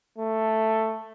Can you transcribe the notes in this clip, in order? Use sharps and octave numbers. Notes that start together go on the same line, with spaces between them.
A3